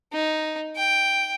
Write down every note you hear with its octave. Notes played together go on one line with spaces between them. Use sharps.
D#4
G5